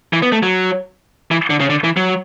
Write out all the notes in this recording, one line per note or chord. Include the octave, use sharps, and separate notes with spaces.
E3
B3
A3
F#3
E3
D3
C#3
D3
E3
F#3